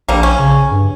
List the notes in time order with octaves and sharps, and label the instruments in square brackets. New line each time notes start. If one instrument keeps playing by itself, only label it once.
[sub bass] A#1 [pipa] D3 G3 A#3
[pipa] C#4
[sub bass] C#3
G2